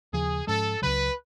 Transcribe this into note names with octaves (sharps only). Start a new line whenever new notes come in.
D#2 C#3 F3 G#4
G#2 F3 G#3 C#4 A4
C#2 C#3 F#3 B4